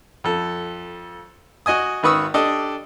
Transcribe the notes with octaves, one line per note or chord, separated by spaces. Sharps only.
F2 A4
F#4 D#5 G#5 D#6
G#1 D#3 B4 C#6 D#6 E6
D4 G4 A4 D#5